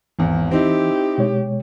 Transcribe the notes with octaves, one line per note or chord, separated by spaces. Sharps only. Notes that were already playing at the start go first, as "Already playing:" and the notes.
G#1 E2 E3
C4 D#4 E4 G4
B2 G#3 C#5